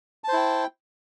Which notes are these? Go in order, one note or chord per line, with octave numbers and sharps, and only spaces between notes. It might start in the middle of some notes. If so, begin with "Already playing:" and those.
E4 C5 G5 A5